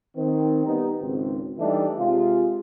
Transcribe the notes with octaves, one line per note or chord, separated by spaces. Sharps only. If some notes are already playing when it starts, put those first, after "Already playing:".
D#3 C4
G3 B3 D#4
G#1 C#2 C4
E3 G3 A3 D4 D#4
C3 G#3 F4